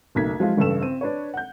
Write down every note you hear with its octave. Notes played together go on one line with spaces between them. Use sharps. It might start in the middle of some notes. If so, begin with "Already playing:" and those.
F#1 B1 A3 G#6 B6
F3 F#3 G#3 E4 F4
A1 G2 C#3 A4 E6 E7
C4 D#7
D4 B4 C#5
F#5 G6